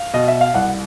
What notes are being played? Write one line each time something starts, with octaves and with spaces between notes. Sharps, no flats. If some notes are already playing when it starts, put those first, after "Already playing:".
Already playing: F5
B2 D#5
E5
F5
C2 F#5